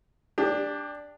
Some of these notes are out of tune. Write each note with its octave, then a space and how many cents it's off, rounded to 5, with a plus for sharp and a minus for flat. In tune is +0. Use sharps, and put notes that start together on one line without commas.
D4 +0 G4 +30